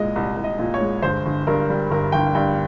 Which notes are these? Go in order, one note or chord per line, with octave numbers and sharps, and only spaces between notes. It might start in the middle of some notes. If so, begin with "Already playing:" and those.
Already playing: C2 A#2 G#3 D#5
C2
C2
D#5
A#2
C#5
G#3
G1 C5
G1
G2 A#4
G3
G1 A#4
G1 G5
G2 G5